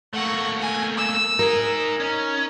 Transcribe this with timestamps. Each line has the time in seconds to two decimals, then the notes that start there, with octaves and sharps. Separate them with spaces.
0.13 A3 A#3 F#5 C#6
0.61 G#5
0.97 E6
1.39 D#4 G#4 A#4
2.00 C#4 D#4